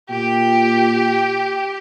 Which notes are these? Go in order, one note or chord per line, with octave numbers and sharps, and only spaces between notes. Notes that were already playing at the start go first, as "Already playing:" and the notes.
A#2 G4 G5